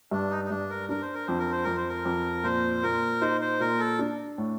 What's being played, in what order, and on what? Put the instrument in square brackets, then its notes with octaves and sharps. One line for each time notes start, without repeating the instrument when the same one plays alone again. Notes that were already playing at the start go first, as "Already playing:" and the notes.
[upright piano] G2 [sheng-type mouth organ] D4
[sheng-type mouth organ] D#4
D#4
[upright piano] G2 [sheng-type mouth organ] D4
[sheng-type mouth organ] A#4
[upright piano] D4 [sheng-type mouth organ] A#4
[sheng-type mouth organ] C5
A#4
[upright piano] F2 [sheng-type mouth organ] C5
[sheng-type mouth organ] A#4
C5
[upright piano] F2 [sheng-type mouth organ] A#4
[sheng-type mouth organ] C5
A#4
[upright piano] F2
[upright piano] A#2 [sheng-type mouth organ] C5
[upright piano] A#2 [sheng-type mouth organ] A#4
[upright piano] D#4 [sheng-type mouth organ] C5
[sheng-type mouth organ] C5
[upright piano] A#2 [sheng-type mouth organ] A#4
[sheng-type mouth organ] A4
[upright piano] D4
A2